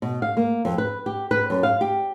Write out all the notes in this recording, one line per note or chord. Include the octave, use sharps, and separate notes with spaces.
B2
F5
A#3
F2
B4
G4
B4
F#2
F5
G4